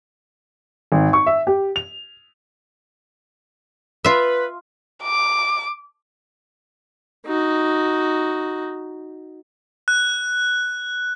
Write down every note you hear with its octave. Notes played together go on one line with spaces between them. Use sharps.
G#1
C#6
E5
G4
F7
F4 B4 E5
D6
D#4 F#4
F#6